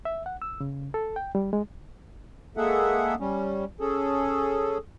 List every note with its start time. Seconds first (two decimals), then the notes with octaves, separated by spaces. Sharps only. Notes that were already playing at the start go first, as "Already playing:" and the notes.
0.05 E5
0.26 F#5
0.42 E6
0.61 C#3
0.94 A4
1.16 G5
1.35 G3
1.53 G#3
2.57 G#3 A#3 G#4 A4 E5 F#5
3.20 G3 C#4
3.80 C#4 G#4 A4